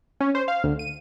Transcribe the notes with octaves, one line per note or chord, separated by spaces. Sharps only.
C#4
C5
F5
D2
D#7